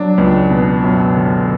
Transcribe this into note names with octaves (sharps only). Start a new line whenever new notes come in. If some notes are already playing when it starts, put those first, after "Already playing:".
Already playing: F#3 D4
C#2
B2
F#2
D3